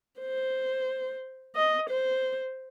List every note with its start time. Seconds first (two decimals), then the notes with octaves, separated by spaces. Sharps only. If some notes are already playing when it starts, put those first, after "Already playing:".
0.20 C5
1.56 D#5
1.89 C5